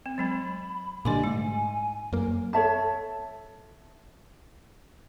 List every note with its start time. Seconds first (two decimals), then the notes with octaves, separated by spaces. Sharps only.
0.06 C4
0.18 F#3 G#3 C4 B5
1.05 A#2 D3 G3 D#5 G#5 C6 D6
1.24 G#2 A3
2.13 F#2 A#3
2.53 A4 C#5 E5 A5